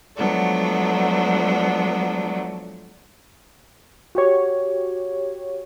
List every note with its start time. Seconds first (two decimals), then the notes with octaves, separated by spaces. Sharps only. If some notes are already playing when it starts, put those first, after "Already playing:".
0.16 F3 F#3 G#3 A3 B3 D4
4.15 F#4 G4 C#5